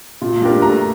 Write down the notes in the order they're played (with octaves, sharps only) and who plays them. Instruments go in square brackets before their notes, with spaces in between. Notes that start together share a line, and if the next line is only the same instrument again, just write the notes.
[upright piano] A#2
G3 D4 G4 A#4
[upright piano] A3 [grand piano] A#5